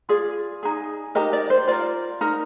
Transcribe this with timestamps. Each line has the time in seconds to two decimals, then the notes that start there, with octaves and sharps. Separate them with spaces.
0.09 F4 G#4 D5
0.63 D#4 G#4
1.15 D#4 G4 A#4 D#5
1.33 D5
1.50 C5
1.67 F4 A#4 D5
2.21 D#4 A#4